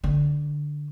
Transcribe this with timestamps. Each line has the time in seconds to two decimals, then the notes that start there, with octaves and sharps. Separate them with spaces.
0.04 D3